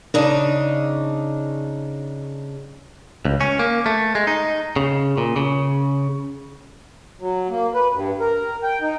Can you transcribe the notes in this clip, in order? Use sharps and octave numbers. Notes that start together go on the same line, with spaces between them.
C#3 D4 D#4
C#2
C#4
A#3
A3
G#3
D#4
C#3
A#2
C#3
F#3
A#3
B4
G2
A#4
G5
D#4